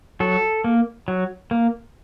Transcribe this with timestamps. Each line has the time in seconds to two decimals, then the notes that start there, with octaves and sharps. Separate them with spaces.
0.20 F#3 A4
0.64 A#3
1.08 F#3
1.51 A#3